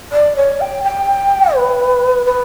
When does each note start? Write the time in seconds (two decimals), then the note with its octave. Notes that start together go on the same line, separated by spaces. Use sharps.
0.12 D5
0.36 C#5
0.60 G5
0.83 G5
1.55 B4
2.25 B4